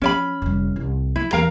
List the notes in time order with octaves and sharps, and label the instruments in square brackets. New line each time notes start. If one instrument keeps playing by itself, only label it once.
[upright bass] F3 [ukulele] C#4 D5 B5
[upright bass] F1 G3
C2
[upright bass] F3 [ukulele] E4
[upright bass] E2 [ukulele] A#4 F5 A#5